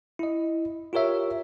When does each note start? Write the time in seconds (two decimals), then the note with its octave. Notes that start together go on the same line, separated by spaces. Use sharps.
0.19 E4 D#5
0.93 F4 G4 A#4 C#5 E5